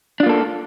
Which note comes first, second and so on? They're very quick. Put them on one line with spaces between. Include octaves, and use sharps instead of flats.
D4 F4 A#3 A4